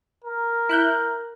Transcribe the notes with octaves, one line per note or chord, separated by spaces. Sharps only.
A#4
E4 F#6 G6